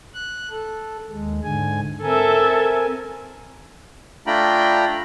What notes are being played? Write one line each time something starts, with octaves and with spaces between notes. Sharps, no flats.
F#6
A4
D#2 G#3
G#2 D3 G#5
C4 A4 A#4 E5 G#5
A3 D4 F4 G5 A#5 B5